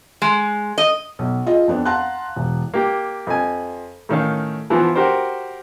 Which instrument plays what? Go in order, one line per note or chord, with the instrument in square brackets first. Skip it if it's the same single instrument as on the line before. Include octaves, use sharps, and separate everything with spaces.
[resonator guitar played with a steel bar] G#3
D#5
[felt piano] B1
F4 G#4 D#5
F2 B3 D4
F5 F#5 A5 A#5 C6 F#6
E1
[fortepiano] A#3 G4
F2 G#5
A2 D#3 C#4 F5
E3 F3 B3
F#4 G4 A#4 C5